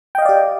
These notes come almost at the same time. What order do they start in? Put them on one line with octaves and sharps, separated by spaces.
G5 D#5 F5 D5 G4